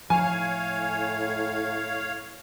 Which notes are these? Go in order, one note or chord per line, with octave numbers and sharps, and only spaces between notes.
A2 F3 C#5 F5 G#5